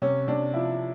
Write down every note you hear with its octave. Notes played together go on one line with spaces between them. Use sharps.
C3 C#4
C3 D4
F3 E4